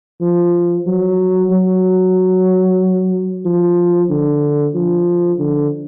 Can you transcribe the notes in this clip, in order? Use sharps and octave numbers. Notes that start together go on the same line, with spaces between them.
F3
F#3
F#3
F3
D3
F3
D3